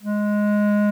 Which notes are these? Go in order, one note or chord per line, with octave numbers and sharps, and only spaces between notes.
G#3